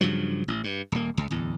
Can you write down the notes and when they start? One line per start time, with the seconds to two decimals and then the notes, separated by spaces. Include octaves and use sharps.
0.01 G2 C#3 F3 F#3
0.48 A1
0.64 G2
0.92 D#1 A#3
1.17 C#2
1.31 D1 E2